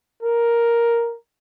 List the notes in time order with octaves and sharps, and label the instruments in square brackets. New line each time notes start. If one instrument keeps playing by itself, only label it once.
[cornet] A#4